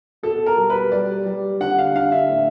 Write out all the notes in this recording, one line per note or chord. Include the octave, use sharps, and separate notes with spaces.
B2 A4
A#4
G3
B4
G3 D5
G3
D3 F#5
F5
D3 F5
E5
A2